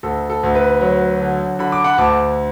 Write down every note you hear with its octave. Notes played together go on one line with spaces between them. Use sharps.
D2 A4
A4
D2
B4
F#3
D3
D3 B5
D6
F#5 B5
D2 A5 D6